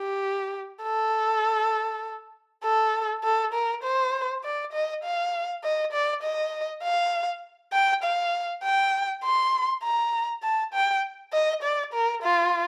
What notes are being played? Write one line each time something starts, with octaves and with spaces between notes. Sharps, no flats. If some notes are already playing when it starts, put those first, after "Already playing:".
Already playing: G4
A4
A4
A4
A#4
C5
D5
D#5
F5
D#5
D5
D#5
F5
G5
F5
G5
C6
A#5
A5
G5
D#5
D5
A#4
F4